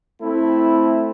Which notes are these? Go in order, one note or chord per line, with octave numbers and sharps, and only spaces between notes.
A3 C4 E4